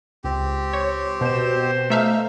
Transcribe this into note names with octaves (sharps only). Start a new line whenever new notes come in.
C#2 C4 G4
C#5
B2 C5 E7
A3 D#4 E5 F5